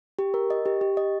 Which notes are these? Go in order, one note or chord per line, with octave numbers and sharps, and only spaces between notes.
G4
A#4
D#5
G4
G4
D#5